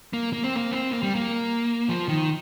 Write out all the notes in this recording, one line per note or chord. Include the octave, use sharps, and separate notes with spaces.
A#3
A#3
C4
A#3
C4
A#3
G3
A#3
F3
D#3